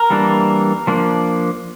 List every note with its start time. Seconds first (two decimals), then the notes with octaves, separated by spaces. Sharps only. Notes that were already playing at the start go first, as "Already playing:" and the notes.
Already playing: A#4
0.10 E3 G3 A#3 D4
0.87 F3 A#3 D4